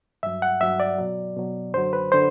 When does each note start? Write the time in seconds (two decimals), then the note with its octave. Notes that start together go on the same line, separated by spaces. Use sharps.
0.23 G2 F#3 E5
0.42 F#5
0.61 G2 F#3 E5
0.80 D5
0.98 B2 F#3
1.36 B2 F#3
1.73 F#2 D3 F#3 C5
1.93 B4
2.12 D3 C5